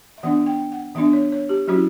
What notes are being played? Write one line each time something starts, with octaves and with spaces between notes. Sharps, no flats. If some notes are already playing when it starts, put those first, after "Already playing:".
E5
E3 B3 D4 F#5
G5
F#5
E3 B3 D4 E5
C#5
C#5
G4
F#3 C#4 E4 F#4